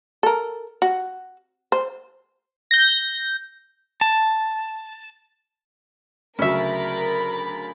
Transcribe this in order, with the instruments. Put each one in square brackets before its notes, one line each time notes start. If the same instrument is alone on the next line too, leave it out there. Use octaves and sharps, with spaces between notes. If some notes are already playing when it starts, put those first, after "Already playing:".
[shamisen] A4 A#4
F#4
C5
[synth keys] G6 A#6
[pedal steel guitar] A5
[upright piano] D2 C#3 F#3 [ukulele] C#4 E5 [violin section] A#4 B5 A6